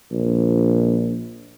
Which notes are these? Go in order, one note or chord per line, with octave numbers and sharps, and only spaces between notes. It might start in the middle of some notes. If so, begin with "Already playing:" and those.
A#1